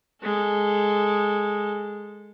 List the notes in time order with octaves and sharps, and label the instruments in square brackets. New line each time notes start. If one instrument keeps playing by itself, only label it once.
[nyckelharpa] G#3 A4